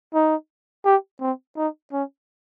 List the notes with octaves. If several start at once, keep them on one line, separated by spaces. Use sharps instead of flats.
D#4
G4
C4
D#4
C#4